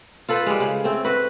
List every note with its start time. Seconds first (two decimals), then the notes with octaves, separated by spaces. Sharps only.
0.29 F4 A4 B4 C5
0.47 G3 G#3
0.60 C#3
0.84 A3 C4
1.05 F#4 B4